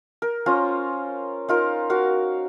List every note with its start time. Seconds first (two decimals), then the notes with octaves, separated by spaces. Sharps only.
0.22 A#4
0.46 C#4 F4 C5 A#5
1.49 D#4 F4 A#4
1.90 F#4 A#4 F5